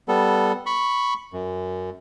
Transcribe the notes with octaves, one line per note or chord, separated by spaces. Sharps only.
G3 B3 A4
B5 C#6
F#2